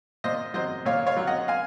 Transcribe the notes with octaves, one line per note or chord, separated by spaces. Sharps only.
A#2 C5 D#5
F#3 C5 D#5
A#2 C#5 F5
C#5 F5
F#3
D#5 F#5
F5 G#5